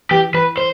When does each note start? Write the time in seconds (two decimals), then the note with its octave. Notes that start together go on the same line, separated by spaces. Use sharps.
0.11 E3 G4
0.34 E3 B4
0.57 C5